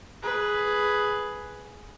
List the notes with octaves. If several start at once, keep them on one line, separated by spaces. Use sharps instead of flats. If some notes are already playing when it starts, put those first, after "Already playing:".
G#4 B4